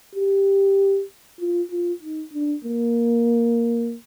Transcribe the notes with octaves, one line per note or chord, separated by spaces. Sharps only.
G4
F4
F4
D#4
D4
A#3